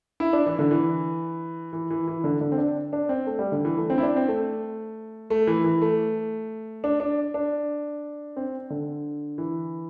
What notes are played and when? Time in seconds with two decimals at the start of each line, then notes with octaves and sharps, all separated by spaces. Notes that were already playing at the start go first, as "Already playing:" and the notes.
0.20 E4
0.33 D4
0.46 E3
0.59 D3
0.71 E3
1.73 E3
1.90 E3
2.08 E3
2.24 D3
2.41 D3
2.52 C4
2.58 D4
2.93 D4
3.09 C4
3.27 A3
3.39 G3
3.52 D3
3.65 E3
3.77 A3
3.90 C4
3.98 E4
4.03 D4
4.16 C4
4.28 A3
5.30 A3
5.47 E3
5.64 E3
5.82 A3
6.84 D4
7.00 D4
7.34 D4
8.37 C4
8.70 D3
9.38 E3